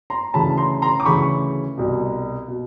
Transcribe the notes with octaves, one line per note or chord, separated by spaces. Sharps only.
A#5 C6
D2 C#3 E3 A5 B5
A#5 C6
A#5 C6
D6
D2 C#3 E3 B5 C#6
C2 B2
B2